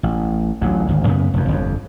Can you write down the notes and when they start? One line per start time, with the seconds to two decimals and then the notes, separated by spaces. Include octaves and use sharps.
0.03 A1
0.62 A1 D2 F#3
0.89 G#1 D2
1.07 F#2 C#3 B3
1.34 F1 F2
1.48 G1 F2